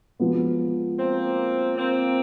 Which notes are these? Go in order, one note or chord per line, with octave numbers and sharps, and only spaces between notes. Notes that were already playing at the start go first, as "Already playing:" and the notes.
F3 G#3 B3
A#3 C4
A#3 C4